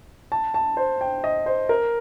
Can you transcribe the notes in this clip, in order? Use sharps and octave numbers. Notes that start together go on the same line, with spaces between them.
A5
A5
C5
G5
D#5
C5
A#4